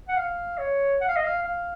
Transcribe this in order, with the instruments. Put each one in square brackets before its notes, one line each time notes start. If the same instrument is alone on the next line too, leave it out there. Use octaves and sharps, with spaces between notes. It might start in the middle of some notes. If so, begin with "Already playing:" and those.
[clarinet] F#5
F5
C#5
F#5
F5
D#5
F5
F5